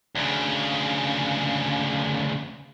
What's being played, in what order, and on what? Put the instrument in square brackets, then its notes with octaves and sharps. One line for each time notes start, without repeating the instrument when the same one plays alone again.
[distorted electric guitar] D2 C#3